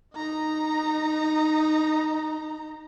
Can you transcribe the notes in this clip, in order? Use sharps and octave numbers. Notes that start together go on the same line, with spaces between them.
D#4 A#5